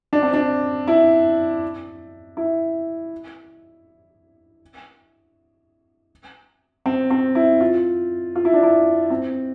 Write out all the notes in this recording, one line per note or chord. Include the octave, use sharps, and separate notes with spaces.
D4
C4
D4
E4
E4
C4
C4
E4
F4
F4
E4
D4
E4
C4